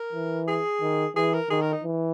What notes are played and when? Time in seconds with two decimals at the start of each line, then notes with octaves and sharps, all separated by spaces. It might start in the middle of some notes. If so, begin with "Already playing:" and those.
Already playing: A#4
0.13 E3
0.47 G#4
0.81 D#3
1.15 E3 G#4
1.34 A#4
1.50 D#3 G#4
1.61 A#4
1.72 D#4
1.84 E3